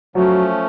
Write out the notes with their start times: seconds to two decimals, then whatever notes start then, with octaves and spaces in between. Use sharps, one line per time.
0.15 F3 F#3 A3 C#4